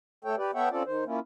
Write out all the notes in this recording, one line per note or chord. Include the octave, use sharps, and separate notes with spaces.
A3 A4 C#5 G5
G4 B4 D5
B3 A4 C#5 E5 F#5 G5
C4 C#4 F4 A4 D5
D#3 C5
A#3 C#4 E4 F4